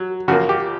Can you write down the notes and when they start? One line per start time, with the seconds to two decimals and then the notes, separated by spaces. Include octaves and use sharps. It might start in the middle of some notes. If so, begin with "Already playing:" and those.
Already playing: F#3
0.28 C#3 F3 A#3 F#4
0.49 G4